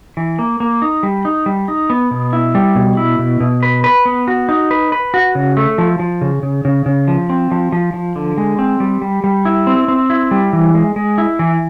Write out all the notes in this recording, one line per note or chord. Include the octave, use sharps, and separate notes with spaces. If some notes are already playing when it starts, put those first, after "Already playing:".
E3
A#3
A#3
D#4
G3
D#4
G3
D#4
B3
B2
E4
G3
B2
E4
B2
B2
B4
B4
B3
F#4
D#4
B4
B4
F#4
C#3
A3
F3
F3
C#3
C#3
C#3
C#3
F3
C4
F3
F3
F3
D3
G#3
C4
G3
G3
G3
E4
C4
C4
E4
G3
E3
G#3
G#3
E4
E3